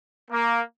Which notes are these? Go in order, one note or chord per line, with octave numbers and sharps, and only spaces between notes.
A#3